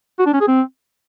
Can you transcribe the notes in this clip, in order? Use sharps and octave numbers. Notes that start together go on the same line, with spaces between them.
F#4
D4
C#4
G#4
C4